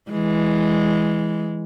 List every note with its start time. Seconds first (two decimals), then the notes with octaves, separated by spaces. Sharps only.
0.11 E3 G#3